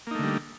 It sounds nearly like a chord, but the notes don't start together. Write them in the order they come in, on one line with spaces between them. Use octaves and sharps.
A#3 D#4 A3 D3 G3